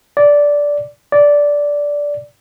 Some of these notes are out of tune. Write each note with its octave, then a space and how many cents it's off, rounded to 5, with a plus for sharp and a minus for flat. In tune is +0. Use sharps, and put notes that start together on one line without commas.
D5 -10
D5 -10